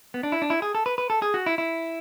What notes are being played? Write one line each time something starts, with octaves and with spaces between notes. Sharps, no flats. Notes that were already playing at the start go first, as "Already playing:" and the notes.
B3
D4
E4
D4
E4
G#4
A4
B4
B4
A4
G#4
F#4
E4
E4